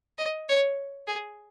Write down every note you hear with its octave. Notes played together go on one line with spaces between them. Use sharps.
D#5
C#5
G#4